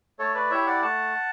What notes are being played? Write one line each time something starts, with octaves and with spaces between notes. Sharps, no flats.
A3 A4 C#5
B4 D5
E4 G4 C#5 E5
D5 F#5
A3 F#5 A5